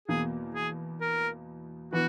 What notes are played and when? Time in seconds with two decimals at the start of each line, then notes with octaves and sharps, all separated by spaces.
0.08 E2 B2 A#3 G#4
0.54 G#4
1.01 A#4
1.93 E3 B3 F#4 B4